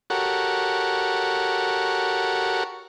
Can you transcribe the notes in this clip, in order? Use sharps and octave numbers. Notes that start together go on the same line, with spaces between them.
F#4 G4 A4 A#4 C#5 F#5